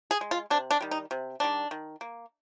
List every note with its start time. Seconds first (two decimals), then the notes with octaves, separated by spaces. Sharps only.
0.11 G#4
0.21 G#3
0.31 F4
0.50 C3 D4
0.71 D4
0.81 D#3 G3
0.91 D#4
1.11 C3
1.40 D#3 G3 D4
1.71 D#3
2.01 A#3